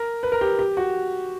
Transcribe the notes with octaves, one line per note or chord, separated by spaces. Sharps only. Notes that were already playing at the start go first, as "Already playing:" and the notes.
Already playing: A#4
B4
A#4
G4
G4
F#4